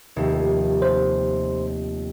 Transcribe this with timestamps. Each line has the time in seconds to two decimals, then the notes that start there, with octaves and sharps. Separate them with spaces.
0.16 F1 D#2
0.82 C5